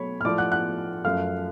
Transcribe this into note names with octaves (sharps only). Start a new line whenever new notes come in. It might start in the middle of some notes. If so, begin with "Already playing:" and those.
Already playing: B2 F#3 A3 C#5 B5 C#6
F6
A2 F3 A3 D5 D6
F#5 F#6
F#5 F#6
F#2 F3 A3 F5 F6